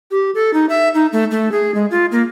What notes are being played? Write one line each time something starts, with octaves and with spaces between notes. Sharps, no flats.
G4
A4
D#4
E5
D#4
A3
A3
G#4
G#3
F4
A#3